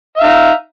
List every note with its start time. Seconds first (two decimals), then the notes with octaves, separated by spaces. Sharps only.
0.16 E5
0.19 F5
0.23 D#4